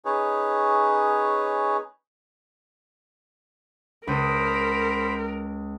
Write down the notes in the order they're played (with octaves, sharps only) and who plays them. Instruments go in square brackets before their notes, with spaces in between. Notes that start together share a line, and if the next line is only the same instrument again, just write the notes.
[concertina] C#4 D#4 G#4 B4 C#5
[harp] C#2 D#6 [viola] A#4 [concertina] C5 B5